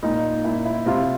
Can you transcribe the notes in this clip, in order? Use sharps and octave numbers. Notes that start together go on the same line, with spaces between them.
A#2 D#4
A#2 E4
E4
C3 F4